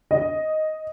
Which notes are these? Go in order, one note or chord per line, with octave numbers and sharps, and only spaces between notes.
D#5